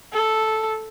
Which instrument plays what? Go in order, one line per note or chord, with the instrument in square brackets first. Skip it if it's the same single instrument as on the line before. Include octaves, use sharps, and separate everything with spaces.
[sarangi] A4